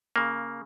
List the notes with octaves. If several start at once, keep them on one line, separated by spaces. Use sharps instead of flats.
C#3 A#3